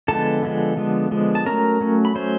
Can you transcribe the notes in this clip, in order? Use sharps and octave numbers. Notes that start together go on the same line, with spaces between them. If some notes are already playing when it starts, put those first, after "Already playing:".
D3 F3 G#3 B3 A4 A5
D3 F3 G#3 B3
D3 F3 G#3 B3
D3 F3 G#3 B3
A5
F#3 A3 C#4 A#4 A#5
F#3 A3 C#4
B5
F#3 A3 C#4 C5 C6